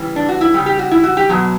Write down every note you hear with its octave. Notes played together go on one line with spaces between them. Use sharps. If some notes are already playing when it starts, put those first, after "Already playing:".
Already playing: C#3 E3 G3
D4
F#4
E4
C#3 G3 G4
G4
F#4
E4
F#4
G4
B2 F#3